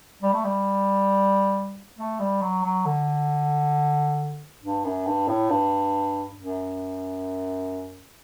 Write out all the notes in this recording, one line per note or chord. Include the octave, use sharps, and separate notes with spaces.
G3
A3
G3
A3
G3
F#3
F#3
D3
G2
F#2
G2
A2
G2
F#2